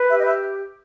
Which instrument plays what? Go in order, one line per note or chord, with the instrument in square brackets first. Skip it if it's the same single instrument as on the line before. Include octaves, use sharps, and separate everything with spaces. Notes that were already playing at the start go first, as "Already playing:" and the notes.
Already playing: [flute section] B4
G4 E5
D#5
E5